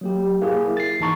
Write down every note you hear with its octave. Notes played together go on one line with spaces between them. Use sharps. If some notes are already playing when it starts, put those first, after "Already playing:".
F#3 A#3 G4
A#3 E4 G#4
A6 C7
G#1 E3 D#4 A5 A#5 C#6